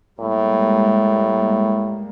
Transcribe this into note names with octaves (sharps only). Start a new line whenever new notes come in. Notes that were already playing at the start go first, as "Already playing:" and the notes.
A2 G3 G#3 A#3